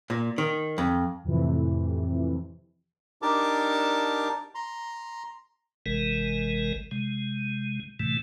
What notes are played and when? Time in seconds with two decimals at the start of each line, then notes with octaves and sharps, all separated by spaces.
0.10 A#2
0.38 D#3
0.78 F2
1.24 F2 A2 C3 E3
3.22 D4 D#4 G4 A#4 A5 D6
4.55 A#5 C6
5.86 G#1 C3 E3 G#3 A#4
6.91 C3 G#3
7.99 A2 C3 E3 A3